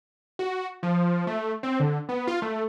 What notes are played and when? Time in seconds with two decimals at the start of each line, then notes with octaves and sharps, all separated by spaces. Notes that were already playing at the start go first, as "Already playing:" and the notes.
0.39 F#4
0.83 F3
1.27 A3
1.63 C4
1.80 D3
2.09 B3
2.27 F4
2.42 A3